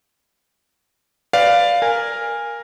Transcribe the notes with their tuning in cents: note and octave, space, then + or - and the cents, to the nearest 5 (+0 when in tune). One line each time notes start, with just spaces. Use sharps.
B4 +25 D5 +0 F5 +0
A#4 +0 G#5 -15